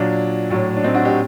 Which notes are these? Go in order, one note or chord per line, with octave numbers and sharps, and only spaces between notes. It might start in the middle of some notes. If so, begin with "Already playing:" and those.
Already playing: A#2 F#3 D4
A2 F#3
D4
C4 D#4
D4 F#4
D#4 G4